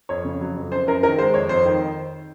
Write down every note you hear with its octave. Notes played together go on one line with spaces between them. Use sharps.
F2 C#5
C#3
F#3
F2
F#2 C5
F#2 A#4
D#3 A#4
G#3 C5
F2 C#5
F2 C5
D#3